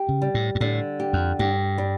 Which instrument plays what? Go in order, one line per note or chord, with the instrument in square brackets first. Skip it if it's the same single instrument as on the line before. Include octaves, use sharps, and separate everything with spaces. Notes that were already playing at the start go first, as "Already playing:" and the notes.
Already playing: [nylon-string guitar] G4
[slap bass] C#3
[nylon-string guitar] G3
[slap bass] A2
G2
[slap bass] A2 [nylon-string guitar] D3
[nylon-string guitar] G4
[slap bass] F2
[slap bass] G2 [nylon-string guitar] G4
[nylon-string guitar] G3